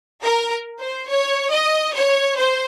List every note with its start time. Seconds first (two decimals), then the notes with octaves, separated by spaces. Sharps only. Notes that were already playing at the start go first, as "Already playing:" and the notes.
0.22 A#4
0.80 C5
1.08 C#5
1.51 D#5
1.94 C#5
2.37 C5